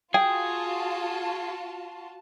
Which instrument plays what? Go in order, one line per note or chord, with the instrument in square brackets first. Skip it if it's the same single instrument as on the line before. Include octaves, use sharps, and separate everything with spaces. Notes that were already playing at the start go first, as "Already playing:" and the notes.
[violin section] F4 F#4 A5 [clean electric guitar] G#4 [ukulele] G5